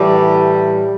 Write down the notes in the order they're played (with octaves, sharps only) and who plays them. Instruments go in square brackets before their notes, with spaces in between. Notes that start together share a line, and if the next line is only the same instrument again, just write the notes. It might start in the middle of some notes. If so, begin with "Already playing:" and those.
Already playing: [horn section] A2 E3 G3